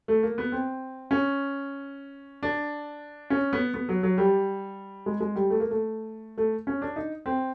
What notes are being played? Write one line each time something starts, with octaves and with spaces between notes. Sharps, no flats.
A3
A#3
B3
C4
C#4
D4
C#4
B3
B3
F#3
F#3
G3
G#3
G#3
G3
A3
A#3
A3
A3
C#4
D4
D#4
C4